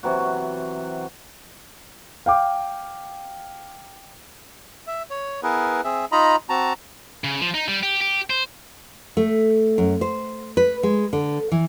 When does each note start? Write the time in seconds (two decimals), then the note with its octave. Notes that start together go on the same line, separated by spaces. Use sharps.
0.03 C3 E3 F#3 F#4
2.26 F5 G5 D6
4.87 E5
5.10 C#5
5.43 B3 E4 G#4 A#4 B4
5.84 C4 G#4 E5
6.12 D#4 F4 D#5 A#5 B5
6.49 C4 F#4 A5 A#5
7.24 C#3
7.41 F3
7.54 D#4
7.68 G3
7.83 G4
8.01 G4
8.30 C5
9.17 A3
9.78 F#2
10.01 C5
10.57 B4
10.83 G#3
11.13 D3
11.52 E3